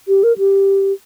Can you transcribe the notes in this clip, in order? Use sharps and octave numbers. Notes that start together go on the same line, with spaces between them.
G4
A#4
G4